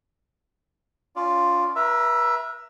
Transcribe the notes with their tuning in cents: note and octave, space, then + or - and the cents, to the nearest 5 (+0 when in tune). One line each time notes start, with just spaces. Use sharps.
C#4 +30 F4 +0 D5 +0
B4 -40 E5 +10 A#5 +0